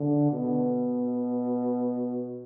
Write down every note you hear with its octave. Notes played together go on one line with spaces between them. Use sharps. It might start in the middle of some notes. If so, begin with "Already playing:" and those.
Already playing: D3
B2